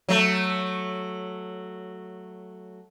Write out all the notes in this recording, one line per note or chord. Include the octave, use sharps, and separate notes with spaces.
F#3 A3